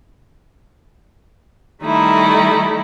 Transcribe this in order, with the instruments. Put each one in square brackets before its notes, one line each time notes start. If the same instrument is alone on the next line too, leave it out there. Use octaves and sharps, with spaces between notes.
[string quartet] D#3 G3 A3 D#4 E4